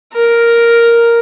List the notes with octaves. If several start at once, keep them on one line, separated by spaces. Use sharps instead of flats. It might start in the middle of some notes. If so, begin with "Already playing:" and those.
A#4